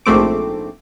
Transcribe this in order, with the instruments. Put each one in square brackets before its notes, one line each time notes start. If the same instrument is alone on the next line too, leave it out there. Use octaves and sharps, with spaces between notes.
[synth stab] A#1 G#2 A3 C4 D6